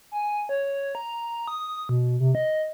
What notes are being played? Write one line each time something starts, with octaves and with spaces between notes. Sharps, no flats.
G#5
C#5
A#5
D#6
B2
C3
D#5